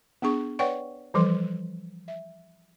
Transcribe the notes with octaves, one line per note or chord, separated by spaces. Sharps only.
B3 D4 G#4 C#6
B4 C#5 D5 F#5 G5 C#6
E3 F3 G3 A4 C6
E5